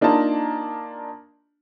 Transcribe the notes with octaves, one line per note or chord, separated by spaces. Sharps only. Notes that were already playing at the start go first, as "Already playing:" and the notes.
A#3 D4 D#4 F4 A5 A#5